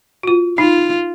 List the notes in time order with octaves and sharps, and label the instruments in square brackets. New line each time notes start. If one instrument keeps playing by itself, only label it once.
[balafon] F4 F#4
[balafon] D#4 [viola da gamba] F4